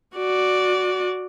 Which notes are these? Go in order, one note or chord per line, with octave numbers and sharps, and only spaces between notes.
F#4 D5